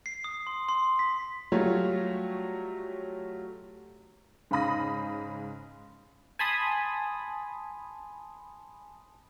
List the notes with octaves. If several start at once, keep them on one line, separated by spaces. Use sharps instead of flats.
C7
D#6
C6
C6
B6
F#3 G3 A3 F4 C#5
G#2 C#3 F5 B5 D#6 A#6
G#5 A5 B5 C6 D#6